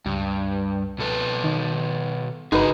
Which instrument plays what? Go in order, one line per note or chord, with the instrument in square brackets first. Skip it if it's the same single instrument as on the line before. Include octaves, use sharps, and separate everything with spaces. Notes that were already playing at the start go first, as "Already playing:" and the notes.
[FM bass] C#2 [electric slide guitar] G2
[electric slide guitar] B2 A4 B4
[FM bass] D#3
[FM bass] G1 [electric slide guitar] C#3 F#4 G#4 [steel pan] D#4 B4